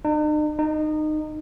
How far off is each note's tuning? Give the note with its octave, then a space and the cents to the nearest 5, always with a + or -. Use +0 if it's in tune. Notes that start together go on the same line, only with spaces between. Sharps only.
D#4 -45
D#4 -20